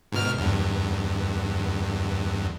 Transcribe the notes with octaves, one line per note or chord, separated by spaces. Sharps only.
G#2 B2 F6
E2 G2